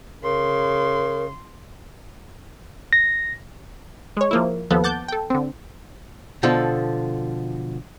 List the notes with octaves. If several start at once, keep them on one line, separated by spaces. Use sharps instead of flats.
C#3 A#4 C6
A#6
G#3 C#5
F3 A#3 E4
D#2 F3 B3 A4
F#5 A5 D6 G6
A4 G5
D3 C4
B2 D3 F3 A4